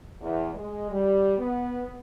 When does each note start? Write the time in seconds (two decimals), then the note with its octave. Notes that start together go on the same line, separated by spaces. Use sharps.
0.21 E2
0.54 G#3
0.90 G3
1.38 B3